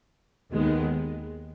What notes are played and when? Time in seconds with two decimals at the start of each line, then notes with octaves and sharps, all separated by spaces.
0.54 D#2 D#3 G#3 B3